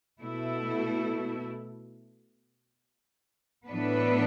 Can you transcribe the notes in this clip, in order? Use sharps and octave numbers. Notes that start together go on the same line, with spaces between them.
B2 A3 E4
A2 E3 B3 D4 B4